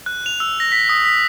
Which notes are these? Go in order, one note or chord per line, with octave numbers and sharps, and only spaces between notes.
F#6
F7
E6
A#6
B6
D#6
B6